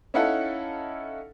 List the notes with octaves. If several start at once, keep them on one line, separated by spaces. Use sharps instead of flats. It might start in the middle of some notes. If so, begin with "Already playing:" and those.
C#4 D#4 E4 A4 F5 F#5